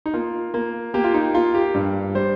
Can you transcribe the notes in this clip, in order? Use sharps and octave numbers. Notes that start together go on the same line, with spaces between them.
D#4
A#3 F4
A#3
A#3 G4
F4
D#4
A#3 F4
G4
G2
G3 C5